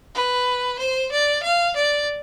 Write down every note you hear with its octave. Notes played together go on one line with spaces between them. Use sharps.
B4
C5
D5
F5
D5